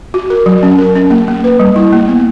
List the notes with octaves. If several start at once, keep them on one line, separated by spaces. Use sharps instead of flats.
F#4
A#4
F#3
C#4
A#4
C#4
A#3
A#3
B4
G3
E4
A#3
B3